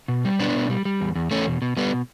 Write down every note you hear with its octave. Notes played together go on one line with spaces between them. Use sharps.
B2
G3
B2 B3 D4
B2
G3
G3
E2
E2
E2 A3 C#4
B2
B2
B2 G3 B3